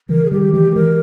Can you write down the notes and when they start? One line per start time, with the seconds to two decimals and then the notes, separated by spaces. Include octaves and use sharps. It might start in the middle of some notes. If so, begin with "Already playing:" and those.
0.09 C#3 E3 A#4
0.25 G#4
0.31 D#3 G3 G4
0.53 E3 G#3 G4
0.71 G#4
0.75 E3 G#3 A#4